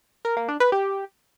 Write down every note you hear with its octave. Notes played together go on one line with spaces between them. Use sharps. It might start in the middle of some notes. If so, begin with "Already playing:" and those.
A#4
A#3
D4
B4
G4